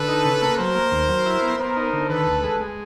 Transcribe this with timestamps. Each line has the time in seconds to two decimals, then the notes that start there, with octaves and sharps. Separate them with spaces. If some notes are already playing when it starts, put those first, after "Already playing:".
Already playing: D3 A4 B4
0.08 D#4
0.25 C#3
0.42 A#3
0.58 F#3 A#4 C5
0.75 A#3
0.92 D#2
1.09 F#3
1.26 E4
1.42 B3
1.59 B3 A#4 C5
1.76 D#4
1.93 D3
2.09 D#3 A4 B4
2.27 D2
2.43 G#3
2.60 G#3